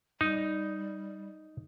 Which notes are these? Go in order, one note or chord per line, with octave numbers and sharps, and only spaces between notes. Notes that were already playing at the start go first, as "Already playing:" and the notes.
G3 D#4